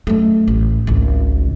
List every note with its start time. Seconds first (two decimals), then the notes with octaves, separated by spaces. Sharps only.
0.07 F#2 A3
0.48 A1
0.87 G#1 C#2